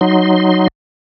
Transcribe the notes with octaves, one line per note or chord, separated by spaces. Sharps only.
F#3 D#4 C6